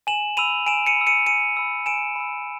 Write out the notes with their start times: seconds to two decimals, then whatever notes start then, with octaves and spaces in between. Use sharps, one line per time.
0.07 G#5 E7 F#7
0.37 B5 E6 D#7 F7
0.66 G#5 D7 E7
0.87 C#7 D#7
0.97 B5 E6
1.07 C#7 D#7
1.26 G#5 C#7 D#7
1.57 B5 E6
1.86 G#5 D7 E7
2.16 B5 E6